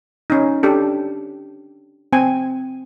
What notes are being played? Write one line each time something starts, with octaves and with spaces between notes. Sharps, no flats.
C#4 D#4
D4 G4 A4
C4 G#5